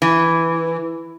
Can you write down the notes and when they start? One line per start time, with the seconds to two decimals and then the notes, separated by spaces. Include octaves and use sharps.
0.02 E3